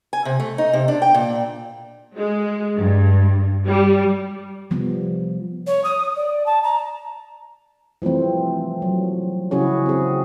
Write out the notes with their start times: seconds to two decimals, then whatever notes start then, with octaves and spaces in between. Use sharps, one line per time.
0.13 G#5
0.25 C3
0.40 A3
0.58 D#4
0.73 C3
0.88 D4
1.02 G5
1.14 A#2
2.16 G#3
2.78 G2
3.66 G3
4.70 C3 F3 G3 B3
5.67 C#5
5.84 D#6
6.16 D5
6.46 A5
6.63 A#5
8.02 E3 F3 G3 A3 C4
8.82 F#3
9.51 C#3 C#4 E4 F#4 G#4 C#5
9.86 C4 G#4